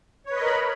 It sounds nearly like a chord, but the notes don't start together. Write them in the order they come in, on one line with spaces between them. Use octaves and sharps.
C#5 B4 D#5 A#4 B5